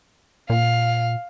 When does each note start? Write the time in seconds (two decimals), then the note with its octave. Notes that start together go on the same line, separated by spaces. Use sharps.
0.50 A#2 F5